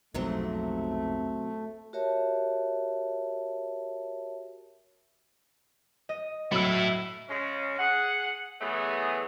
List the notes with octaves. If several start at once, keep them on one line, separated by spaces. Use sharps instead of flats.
B1 F2 G#2 C3 F#3 A3 C4
F#4 G4 A#4 C#5 E5 A5
D#5
F#3 A3 E4 E6
C#3 G#3 C#4
G#4 F#5
E3 F#3 A3 B3 G#4